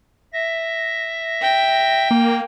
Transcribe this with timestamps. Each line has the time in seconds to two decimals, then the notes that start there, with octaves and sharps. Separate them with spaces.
0.33 E5 A#6
1.42 G5
2.11 A#3